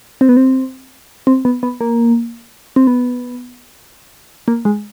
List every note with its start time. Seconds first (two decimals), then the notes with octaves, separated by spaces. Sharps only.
0.21 C4
0.29 B3
0.37 C4
1.27 C4
1.45 B3
1.63 B3
1.81 A#3
2.76 C4
2.87 B3
4.48 A#3
4.65 G#3